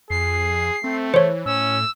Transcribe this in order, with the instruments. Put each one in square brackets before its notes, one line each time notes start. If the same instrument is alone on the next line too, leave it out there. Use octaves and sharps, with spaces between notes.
[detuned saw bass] F2 [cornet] G#4 [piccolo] C7
[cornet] A3 [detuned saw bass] C4
[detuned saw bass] E3 [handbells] C5 C#5
[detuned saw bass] A2 [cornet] C#4 [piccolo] E6